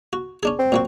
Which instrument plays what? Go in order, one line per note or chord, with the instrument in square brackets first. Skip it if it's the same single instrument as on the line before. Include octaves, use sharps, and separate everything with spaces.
[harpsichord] F#4
C#4 D4 G#4
[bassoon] C4
[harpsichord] A#2 F#3 F#4